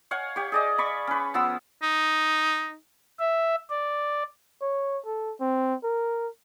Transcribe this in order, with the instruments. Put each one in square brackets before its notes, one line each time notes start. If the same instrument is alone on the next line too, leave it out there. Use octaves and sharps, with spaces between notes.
[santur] C#5 F5 F#5 G#5
G4 C#5
G#4 D5 D#5
D5 B5 C#6
C#4 B4
F3 B3 E6
[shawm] D#4
[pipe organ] E5
D5
[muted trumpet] C#5
A4
C4
A#4